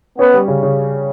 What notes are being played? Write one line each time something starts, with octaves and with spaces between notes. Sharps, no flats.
B3 C#4
G3
C#3
C#3